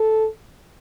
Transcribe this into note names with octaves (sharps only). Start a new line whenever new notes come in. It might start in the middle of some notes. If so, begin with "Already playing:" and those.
Already playing: A4